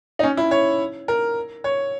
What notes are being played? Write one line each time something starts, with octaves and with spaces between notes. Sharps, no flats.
D#4
C#4
E4
C#5
A#4
C#5